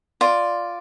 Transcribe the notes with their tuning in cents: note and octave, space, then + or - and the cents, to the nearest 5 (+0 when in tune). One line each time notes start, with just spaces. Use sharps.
F4 +0 D5 +0